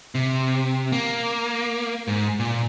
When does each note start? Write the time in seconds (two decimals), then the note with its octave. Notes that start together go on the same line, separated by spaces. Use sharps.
0.15 C3
0.92 A#3
2.08 G#2
2.40 A#2